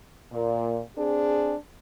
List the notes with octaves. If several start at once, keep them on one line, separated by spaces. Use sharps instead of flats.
A#2
C4 D4 G#4